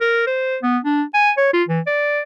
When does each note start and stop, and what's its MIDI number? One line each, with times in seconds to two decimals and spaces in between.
0.01 0.25 70
0.27 0.57 72
0.63 0.78 59
0.84 1.02 62
1.14 1.31 80
1.37 1.49 73
1.53 1.63 65
1.69 1.80 52
1.87 2.21 74